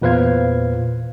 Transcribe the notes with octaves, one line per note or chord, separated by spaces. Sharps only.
E2 A#2 B4 C5 F5 G#6